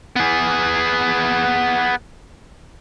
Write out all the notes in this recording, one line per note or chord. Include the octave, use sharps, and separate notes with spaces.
B3 G#4